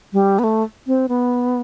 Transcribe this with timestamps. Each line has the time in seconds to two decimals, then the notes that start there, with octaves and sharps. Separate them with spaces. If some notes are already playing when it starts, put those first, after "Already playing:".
0.13 G3
0.39 B3
0.44 A3
0.87 C4
1.09 B3